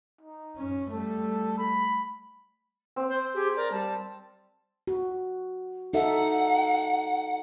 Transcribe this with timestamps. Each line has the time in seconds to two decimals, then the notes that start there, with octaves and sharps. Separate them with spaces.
0.21 D#4
0.57 F#2 C#4
0.91 G3 A3 A4
1.58 B5
2.96 C4
3.09 C5
3.34 G4 G#4
3.56 A#4 D5
3.72 G3 A5
4.87 F#4
5.94 D#4 A4 E5 F#5